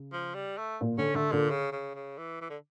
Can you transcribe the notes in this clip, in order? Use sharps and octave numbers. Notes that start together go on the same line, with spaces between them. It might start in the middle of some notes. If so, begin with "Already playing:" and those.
Already playing: C#3
F3
G3
A3
A#2
D3 C#4
D3 A3
A#2 D3
C#3
C#3
C#3
E3
E3
D3